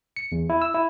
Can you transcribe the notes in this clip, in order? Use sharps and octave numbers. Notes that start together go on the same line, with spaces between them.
C#7
E2
E4
E6
E4